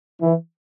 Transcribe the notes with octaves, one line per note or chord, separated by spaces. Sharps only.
E3